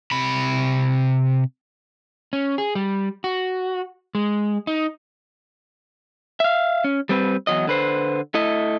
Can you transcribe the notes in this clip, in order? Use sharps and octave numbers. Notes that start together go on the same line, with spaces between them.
C3 B5
C#4
G#4
G3
F#4
G#3
D#4
E5 F5
C#4
G3 C4 B4
E2 F#3 D#5
D3 B4 C5
A3 E4 D#5